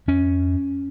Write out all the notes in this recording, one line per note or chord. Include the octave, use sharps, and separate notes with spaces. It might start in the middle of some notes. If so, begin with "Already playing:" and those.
F2 C#4